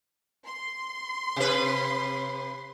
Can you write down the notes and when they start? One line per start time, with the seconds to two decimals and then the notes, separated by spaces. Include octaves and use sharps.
0.46 C6
1.36 C3 B4